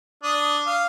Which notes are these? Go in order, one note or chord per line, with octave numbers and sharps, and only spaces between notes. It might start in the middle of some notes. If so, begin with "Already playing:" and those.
D4 D#6
F5